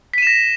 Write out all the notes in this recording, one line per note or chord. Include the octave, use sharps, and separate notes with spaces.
A#6 B6 D#7 E7